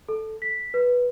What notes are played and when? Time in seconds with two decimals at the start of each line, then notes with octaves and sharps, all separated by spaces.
0.09 A4
0.42 B6
0.74 B4